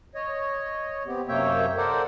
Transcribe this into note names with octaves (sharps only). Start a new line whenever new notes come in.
C#5 D#5
B3 C4 G4
F#2 C3 A#3 C#5 E5 G5
A4 A#4 C5 D5 F#5